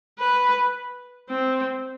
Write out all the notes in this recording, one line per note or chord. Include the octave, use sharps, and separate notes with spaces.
B4
C4